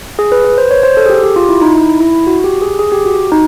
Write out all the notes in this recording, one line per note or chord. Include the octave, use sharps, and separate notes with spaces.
G#4
B4
B4
C5
C#5
C5
A4
G#4
G4
G4
F4
E4
D#4
E4
E4
F#4
G4
G#4
G#4
G4
F#4
D#4